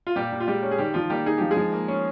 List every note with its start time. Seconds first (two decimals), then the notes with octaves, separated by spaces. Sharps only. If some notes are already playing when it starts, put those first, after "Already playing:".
0.07 F4
0.16 A#2 G3 G4
0.32 A#2
0.40 F4
0.48 G3 G#3 G4
0.63 C#4
0.71 G#4
0.78 D#3 G3 G4
0.94 D#3 F3 F4
1.10 G3 A#3 G4
1.26 D#4 G#4
1.38 F3 G4
1.51 G#3 G#4
1.57 F3
1.73 A#3
1.88 C#4